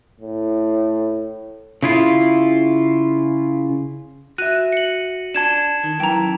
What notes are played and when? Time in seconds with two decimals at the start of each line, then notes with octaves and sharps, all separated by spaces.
0.20 A2
1.83 C#3 E4 F4
4.38 F#4 E5 F#6 D#7
4.73 C#7 F#7
5.35 D4 A5 G#6 E7
5.84 D#3
6.00 F#2 E3 G5 A#5